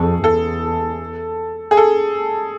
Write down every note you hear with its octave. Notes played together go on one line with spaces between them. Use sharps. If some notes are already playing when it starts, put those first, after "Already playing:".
Already playing: F2 G#4 A4
E2 A4
G#4
A4